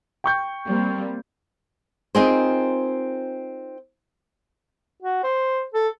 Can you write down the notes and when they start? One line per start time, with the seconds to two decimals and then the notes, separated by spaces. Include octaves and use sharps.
0.24 G5 C#6 G6
0.66 G3 A#3 C4
2.15 C4 D#4 F4 G#4 A#4 C5
5.02 F#4
5.23 C5
5.74 A4